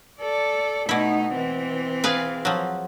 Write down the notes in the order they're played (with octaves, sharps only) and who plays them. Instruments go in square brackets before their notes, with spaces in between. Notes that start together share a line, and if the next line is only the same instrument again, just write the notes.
[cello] A4 D5
[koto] B2 E4 [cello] A3 D#4
[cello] E3 C4
[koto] G#4 B4 F5
F3 F#3